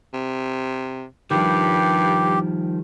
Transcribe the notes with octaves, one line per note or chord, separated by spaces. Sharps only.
C3
G2 D#3 F3 G3 G4